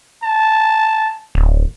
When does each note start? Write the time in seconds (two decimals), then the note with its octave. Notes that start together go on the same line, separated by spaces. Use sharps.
0.23 A5
1.35 D1